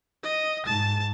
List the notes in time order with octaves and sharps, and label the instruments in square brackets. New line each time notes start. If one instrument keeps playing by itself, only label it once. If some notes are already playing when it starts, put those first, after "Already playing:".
[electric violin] D#5
[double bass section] G#2 [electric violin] A5